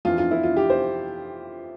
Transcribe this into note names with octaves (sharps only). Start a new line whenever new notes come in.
F2 E3 F4
F4
E4
F4
G4
C5